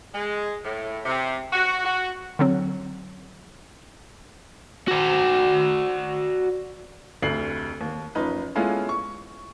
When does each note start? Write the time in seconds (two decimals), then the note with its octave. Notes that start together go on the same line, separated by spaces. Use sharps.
0.14 G#3
0.65 A2
1.05 C3
1.53 F#4
1.85 F#4
2.39 D3 F#3 C4
4.88 F#4 D5
7.22 F1 D2 A3 C7 F#7
7.81 D#2
8.15 F#1 F3 D#4 B4
8.55 G#3 B3 C#4 E4 F4 A4
8.89 C#6